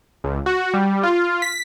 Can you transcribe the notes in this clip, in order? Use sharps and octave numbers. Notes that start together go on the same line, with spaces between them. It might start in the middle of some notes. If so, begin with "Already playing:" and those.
C#2
F#4
G3
F4
B6